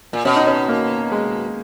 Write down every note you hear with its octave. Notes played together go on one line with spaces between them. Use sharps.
A#2
B2 C#4
D#4
C#4
A#3
G#3